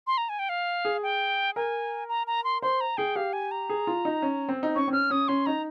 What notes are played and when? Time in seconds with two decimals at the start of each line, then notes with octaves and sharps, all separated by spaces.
0.07 C6
0.18 A#5
0.29 G#5
0.39 G5
0.49 F5
0.85 G#4
1.03 G5
1.56 A#4 G#5
2.09 A#5
2.27 A#5
2.44 C6
2.62 C5 C6
2.81 A#5
2.97 G#4 G5
3.16 G4 F5
3.33 G#5
3.51 A#5
3.69 G#4
3.87 F4
4.05 D#4
4.22 C#4
4.49 C4
4.63 D#4
4.76 C#4 C#6
4.88 C4
4.93 C#4 F6
5.10 C#4 D#6
5.28 C#4 C6
5.46 D#4 A#5